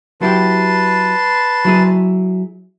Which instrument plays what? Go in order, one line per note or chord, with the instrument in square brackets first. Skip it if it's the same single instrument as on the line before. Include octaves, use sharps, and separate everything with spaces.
[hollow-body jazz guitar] F#3 E4 G4 [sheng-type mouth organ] B4 A5 C6
[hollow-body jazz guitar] F#3 E4 G#4